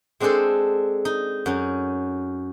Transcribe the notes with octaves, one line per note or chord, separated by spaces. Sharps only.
G#3 C4 D4 G#4 A4 C5
D#4
F#2 C#4